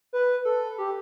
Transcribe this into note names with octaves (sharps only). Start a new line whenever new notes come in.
B4
A4
G4